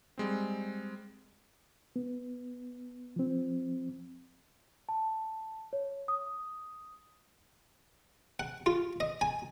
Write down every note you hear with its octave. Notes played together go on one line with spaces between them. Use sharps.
G3 G#3 C4
B3
F3 C4
A5
C#5
D#6
F#5
F4
D#5
G#5